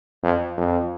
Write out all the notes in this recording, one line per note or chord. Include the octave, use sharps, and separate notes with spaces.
F2
F2